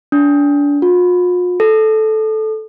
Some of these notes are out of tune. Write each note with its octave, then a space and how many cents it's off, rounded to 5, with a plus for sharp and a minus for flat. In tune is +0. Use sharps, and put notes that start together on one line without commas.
D4 -30
F4 +45
A4 -10